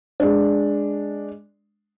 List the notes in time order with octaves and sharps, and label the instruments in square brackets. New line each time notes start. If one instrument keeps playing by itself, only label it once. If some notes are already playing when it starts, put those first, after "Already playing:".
[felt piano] G#3 D4